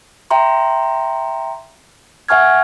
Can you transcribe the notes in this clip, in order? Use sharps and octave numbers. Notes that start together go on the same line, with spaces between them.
E5 G5 A#5 C6
E5 F#5 G#5 C#6 F6 G#6